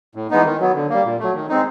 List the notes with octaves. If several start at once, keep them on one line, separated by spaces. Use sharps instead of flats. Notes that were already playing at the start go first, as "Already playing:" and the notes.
A2
E3 G#3 B3 D#4
D#3
F#3 B3
D3
G3 A#3
A#2
F#3 A3
D#3
G#3 C4 D#4